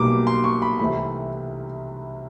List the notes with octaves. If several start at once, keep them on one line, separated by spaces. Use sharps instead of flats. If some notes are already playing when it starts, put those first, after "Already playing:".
Already playing: B1 B2 G3 A#3 D6
C6
C#6
B5
C2 C3 E3 A3 B5